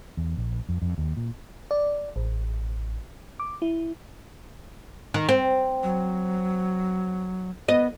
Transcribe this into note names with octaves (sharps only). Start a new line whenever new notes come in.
E2
A#1
F2
F2
D#2
A#2
D5
A1
D6
E4
D#3
C4
F#3
B3 D#5